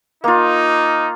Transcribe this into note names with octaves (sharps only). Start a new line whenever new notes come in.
A#3 D#4 F4